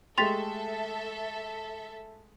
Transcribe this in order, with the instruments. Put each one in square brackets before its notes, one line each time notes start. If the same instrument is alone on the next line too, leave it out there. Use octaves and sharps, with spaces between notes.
[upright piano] G#3 A3 G4 [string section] A4 E5 [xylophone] C6 A6 B6